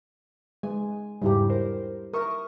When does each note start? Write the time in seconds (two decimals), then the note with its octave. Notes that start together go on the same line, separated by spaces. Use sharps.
0.63 G#3 G#5
1.22 E2 G#2 C#3 G3 E4 G4
1.50 A#4 C5
2.14 A#4 E5 C#6 D#6